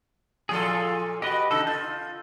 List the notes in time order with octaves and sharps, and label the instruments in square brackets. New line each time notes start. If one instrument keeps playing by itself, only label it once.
[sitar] A#2 F3 A4 [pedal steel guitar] F4 G#4
[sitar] F#4 D#5 [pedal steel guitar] G4 B4
[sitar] C#3 D#4 [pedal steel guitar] A4
[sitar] F4 [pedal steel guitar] G6